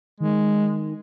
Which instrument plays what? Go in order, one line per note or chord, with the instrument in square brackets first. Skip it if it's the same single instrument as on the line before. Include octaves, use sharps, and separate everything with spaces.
[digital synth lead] D#3 [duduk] G#3